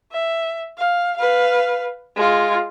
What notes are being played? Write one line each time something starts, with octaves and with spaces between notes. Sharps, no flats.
E5
F5
B4 F5
G#3 F4